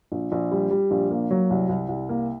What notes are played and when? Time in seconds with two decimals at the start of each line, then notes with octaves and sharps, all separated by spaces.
0.12 A#1
0.32 A#1
0.51 G3
0.71 G3
0.91 A#1
1.11 A#3
1.30 F#3
1.50 C2
1.69 C2
1.89 C2
2.09 A#3